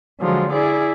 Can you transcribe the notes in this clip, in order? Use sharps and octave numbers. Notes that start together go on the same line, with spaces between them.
D3 F3 F#3 G#3
E4 G#4 D5